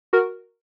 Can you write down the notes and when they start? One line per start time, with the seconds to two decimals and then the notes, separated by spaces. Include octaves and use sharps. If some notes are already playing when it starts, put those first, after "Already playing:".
0.13 F#4 A#4